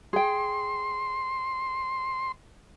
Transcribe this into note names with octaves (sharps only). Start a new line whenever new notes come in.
G#4 G5 C6